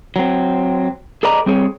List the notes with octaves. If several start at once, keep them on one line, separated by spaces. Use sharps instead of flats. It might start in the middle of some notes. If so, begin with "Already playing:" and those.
F#3 C4
G#4 A4 B4 D5 D#5 A#5
G3 C4 G#4 C#5